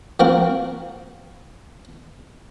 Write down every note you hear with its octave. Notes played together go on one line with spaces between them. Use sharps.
F3 A#3 C4 F#4 A#4